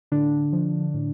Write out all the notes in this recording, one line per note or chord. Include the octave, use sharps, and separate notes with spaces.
A2 D3 D4
F3
A2